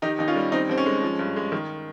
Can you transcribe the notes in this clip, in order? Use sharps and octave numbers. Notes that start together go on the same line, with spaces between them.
D#3 D#4 G4
D#2 D#4
C#4 F4
G3
D#3 C4 D#4
D#2 C4
C#4
G#3
F3
G2
G#3
D#3